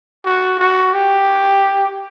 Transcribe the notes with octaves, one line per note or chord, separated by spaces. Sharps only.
F#4
F#4
G4